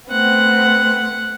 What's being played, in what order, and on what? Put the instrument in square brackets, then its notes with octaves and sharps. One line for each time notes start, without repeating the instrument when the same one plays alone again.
[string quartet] A3 [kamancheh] B3 C4 [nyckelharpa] F#5